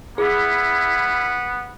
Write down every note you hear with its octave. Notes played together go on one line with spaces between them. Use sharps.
B3 E4 G#4